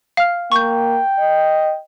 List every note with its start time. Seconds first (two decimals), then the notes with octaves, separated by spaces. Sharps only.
0.17 F5 F6
0.52 A#3 G5 C#6 G6
1.19 D#5